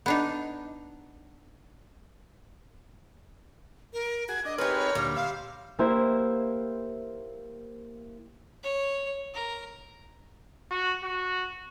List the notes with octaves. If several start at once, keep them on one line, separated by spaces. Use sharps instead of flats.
B3 D4 D#4
A#4
F#4 G#4 G#6
D4 D#5
C4 D#4 G4 G#4 A#4 B4 C#5
D2 A#2 G3 F5
E5 F5 C6
A#3 E4 G4 C5 E5
C#5
A#4
F#4
F#4